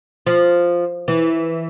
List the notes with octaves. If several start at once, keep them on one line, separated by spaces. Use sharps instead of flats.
F3
E3